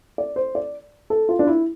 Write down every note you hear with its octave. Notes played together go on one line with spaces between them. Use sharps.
D5
C5
D5
A4
F4
D4
E4